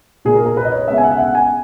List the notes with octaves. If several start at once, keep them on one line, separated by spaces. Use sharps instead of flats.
A#2 A#3 G#4
A#4
A#4
B4
D#5
C#5
C#3 G#3 B3 E5
G#5
F#5
E5
F#5
G#5